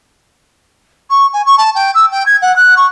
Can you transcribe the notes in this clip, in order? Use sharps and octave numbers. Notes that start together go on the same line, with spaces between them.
C#6
G#5
C#6
A5
G5
E6
G5
G#6
F#5
F#6
C#6